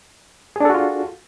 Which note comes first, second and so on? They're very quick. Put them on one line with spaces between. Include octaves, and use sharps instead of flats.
G#4 D4 A4 F#4 F4